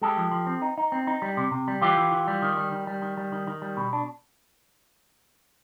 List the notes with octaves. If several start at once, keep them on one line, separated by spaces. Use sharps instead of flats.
G#3 G4 A4
F3
F3
C4
D#4
D#4
C4
D#4
G3
C3
C3
G3
E3 F4 G4
E3
E3
G3
D#3
G3
D#3
G3
D#3
G3
D#3
D#3
G3
B2
D4